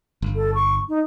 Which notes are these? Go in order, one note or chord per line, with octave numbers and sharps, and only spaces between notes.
G1
A4
C#6
D#4